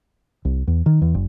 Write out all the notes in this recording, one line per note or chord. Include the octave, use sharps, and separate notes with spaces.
C2
E2
D#3
E2
F#1